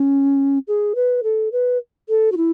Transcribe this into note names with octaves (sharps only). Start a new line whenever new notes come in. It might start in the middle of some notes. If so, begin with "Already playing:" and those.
Already playing: C#4
G#4
B4
A4
B4
A4
F#4
E4